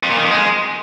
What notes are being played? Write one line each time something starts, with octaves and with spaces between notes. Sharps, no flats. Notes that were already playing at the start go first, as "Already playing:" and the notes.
F2
A#2
D#3
F2
G#3